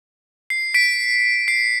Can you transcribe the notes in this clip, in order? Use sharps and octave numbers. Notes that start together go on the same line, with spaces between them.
C7
B6 D7
C7